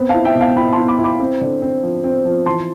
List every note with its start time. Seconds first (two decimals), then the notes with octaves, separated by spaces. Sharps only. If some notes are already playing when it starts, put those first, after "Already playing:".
Already playing: B3 C4
0.09 F5 A5
0.14 E4
0.25 E5 G5
0.35 B2
0.40 F5 A5
0.56 E4 G5 B5
0.73 A5 C6
0.78 E4
0.88 B5 D6
0.99 E4
1.04 B5 D6
1.20 C4
1.41 D3
1.62 C4
1.83 F3
2.04 C4
2.25 F3
2.46 E3 A5 C6